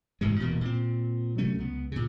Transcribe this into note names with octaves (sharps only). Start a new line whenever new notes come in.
A1 G#2 C3 G#3
D#1 B2 E3 A#3
A#2 C4
C3 F#3 A3 C#4
C#2 B3
A#2 C#3